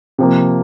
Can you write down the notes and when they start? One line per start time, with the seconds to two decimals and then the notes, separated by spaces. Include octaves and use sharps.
0.18 C3 F3 A#3